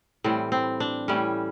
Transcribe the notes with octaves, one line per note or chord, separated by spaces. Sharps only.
A2 E3 G3 C4
C4
D4
A2 E3 G3 C#4